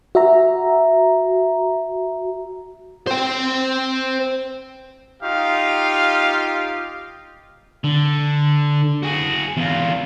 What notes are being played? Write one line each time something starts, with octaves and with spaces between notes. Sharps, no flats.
F#4 E5 A#5
C5 G5
D#4 F4 G4 F5
D3
F#4 G#4
E2 F4